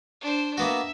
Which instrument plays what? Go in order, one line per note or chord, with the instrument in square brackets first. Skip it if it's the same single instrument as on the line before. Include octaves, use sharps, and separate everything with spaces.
[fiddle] D4 C5
[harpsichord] A#3 B3 F#4 [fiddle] E5